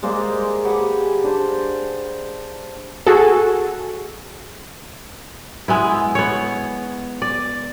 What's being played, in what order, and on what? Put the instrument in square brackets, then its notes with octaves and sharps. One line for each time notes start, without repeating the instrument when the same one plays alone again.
[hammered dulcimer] G#3 A#3 C5 D5
G4 G#4 B4 F#5
D4 C5
[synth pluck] F#4 G#4 A4
[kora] G#3 B3 E4
B3 C#5
D5